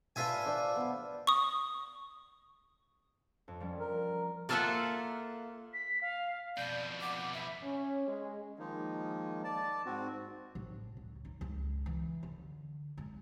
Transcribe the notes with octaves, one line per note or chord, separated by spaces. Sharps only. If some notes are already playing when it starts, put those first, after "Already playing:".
D4 F4 B4 E5 G#5 A5
D4 C5 D5
B3
C#6 D#6
F2
F3 G3 C#4
A#4
A#3 F4 A4 C5 E5 F#5
B6
F5
F2 B2 D5 G6
F#5 D6
E5 B5
C#4
G#3
D#3 F3 G#3 A#3 D#4
D5 A5
G#2 C4 F#4
A1
C#2
D#4
C#2
E3
D3
G#3